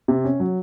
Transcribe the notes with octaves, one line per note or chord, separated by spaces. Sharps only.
C3
C#4
F#3